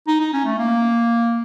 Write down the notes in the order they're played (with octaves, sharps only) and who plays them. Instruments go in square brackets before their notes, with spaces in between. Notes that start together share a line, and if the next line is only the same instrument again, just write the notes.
[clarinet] D#4
D#4
C#4
A3
A#3